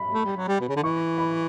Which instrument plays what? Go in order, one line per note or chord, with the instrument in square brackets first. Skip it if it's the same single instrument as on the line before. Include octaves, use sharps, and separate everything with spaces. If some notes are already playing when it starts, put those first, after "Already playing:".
Already playing: [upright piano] B5
[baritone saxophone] A3
G3
F#3
G3
B2
C#3
D3
[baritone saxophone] E3 [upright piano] C#6
[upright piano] B5